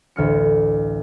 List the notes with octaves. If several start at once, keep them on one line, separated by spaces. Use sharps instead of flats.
A1 D2 F6 C#7